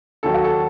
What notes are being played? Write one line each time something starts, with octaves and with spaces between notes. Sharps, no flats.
D#2 D#3 F#3 A4
F#4
A4